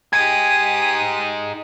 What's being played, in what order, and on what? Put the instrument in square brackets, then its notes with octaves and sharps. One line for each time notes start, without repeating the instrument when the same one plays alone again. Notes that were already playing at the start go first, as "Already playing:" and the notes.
[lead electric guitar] D#4 G#4 [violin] G4 D#6 [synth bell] G#6